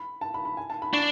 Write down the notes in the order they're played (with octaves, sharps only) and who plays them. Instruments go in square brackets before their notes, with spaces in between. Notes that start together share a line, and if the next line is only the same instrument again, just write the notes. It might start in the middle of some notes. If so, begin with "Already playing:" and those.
Already playing: [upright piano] B5
A5
B5
B5
G#5
A5
B5
[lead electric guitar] D4 [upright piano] C#6